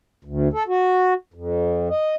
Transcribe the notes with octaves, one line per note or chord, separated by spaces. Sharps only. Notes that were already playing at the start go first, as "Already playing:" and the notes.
D2
A4
F#4
F2
D#5